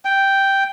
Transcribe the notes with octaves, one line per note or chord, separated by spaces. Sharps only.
G5